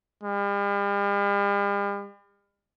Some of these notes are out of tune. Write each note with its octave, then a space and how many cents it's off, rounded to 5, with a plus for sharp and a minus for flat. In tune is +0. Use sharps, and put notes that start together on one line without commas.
G3 +45